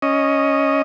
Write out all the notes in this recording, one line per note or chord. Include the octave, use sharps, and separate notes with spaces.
C#4 D#5